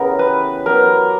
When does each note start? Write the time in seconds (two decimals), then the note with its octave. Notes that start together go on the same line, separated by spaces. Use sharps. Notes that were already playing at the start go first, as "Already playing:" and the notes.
Already playing: C#3 E3 B3 G4 A#4
0.19 B4
0.66 F#3 B3 D4 A#4